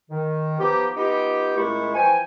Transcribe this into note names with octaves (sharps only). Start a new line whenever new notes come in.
D#3
F3 B3 D#4 G4
B3 D#4 F4 G4
C#2 A#2 G#3 A3 E4 C#6
E3 F3 G5 G#5